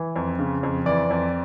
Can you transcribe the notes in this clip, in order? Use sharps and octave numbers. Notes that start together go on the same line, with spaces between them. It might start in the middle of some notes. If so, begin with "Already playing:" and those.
Already playing: E3
F2
C#3
F2
E3 D5
F2